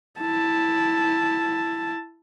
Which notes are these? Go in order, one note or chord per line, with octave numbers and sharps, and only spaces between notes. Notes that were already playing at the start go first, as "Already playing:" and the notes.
E4 A5